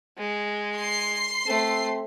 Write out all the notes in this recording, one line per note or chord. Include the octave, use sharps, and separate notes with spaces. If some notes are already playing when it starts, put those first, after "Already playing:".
G#3
C6 C7
A3 C4